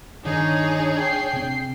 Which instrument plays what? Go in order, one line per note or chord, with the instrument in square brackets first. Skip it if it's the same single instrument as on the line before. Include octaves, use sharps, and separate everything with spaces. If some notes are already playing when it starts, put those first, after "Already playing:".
[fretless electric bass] G1 D#3 [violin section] D4 G#4 C#5 [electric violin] D#4
[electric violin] G5 C7
[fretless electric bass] C3 C4